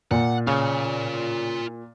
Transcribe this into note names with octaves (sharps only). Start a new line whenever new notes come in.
A#2 F#5
C#3 F4 D5